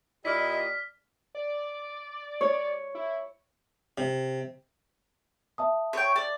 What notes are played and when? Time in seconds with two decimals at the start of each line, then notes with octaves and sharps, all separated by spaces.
0.25 A#2 E4 G4 D5 D#5 D6 F6 B6
1.35 D5
2.41 C#5
2.95 E4
3.98 C3
5.58 E5 A5 D#6
5.93 C#5 G5
6.16 D5